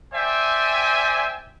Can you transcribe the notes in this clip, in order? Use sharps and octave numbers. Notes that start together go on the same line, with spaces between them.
C5 D5 E5 G5 G#5